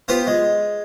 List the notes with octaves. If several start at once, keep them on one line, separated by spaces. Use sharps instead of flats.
B3 F4 G4 C5
G#3